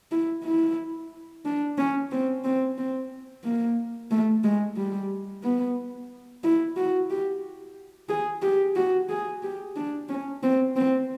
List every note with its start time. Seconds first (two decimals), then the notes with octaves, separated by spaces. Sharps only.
0.11 E4
0.45 E4
1.45 D4
1.78 C#4
2.11 C4
2.44 C4
2.78 C4
3.44 A#3
4.11 A3
4.44 G#3
4.77 G3
5.43 B3
6.44 E4
6.77 F#4
7.10 G4
8.09 G#4
8.42 G4
8.76 F#4
9.09 G#4
9.43 G4
9.76 D4
10.09 C#4
10.43 C4
10.76 C4